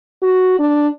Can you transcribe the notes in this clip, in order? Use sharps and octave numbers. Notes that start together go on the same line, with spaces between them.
F#4
D4